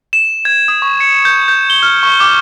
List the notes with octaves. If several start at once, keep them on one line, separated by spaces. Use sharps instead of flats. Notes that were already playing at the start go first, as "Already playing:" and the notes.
E7
G#6
D#6
C#6
C#7
G6
G6
G7
F6
C#6
D6